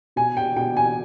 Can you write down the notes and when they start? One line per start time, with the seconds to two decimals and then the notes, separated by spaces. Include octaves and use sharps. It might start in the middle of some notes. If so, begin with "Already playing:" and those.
0.16 B2 G#5
0.37 G5
0.57 B2 G5
0.77 G#5